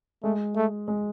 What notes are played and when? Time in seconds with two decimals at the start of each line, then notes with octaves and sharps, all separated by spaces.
0.23 G#3 A3
0.56 A3
0.88 G#3